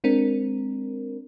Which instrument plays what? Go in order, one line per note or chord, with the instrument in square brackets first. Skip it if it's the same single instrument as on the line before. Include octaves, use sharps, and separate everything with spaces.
[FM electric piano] G#3 C4 D4 A#4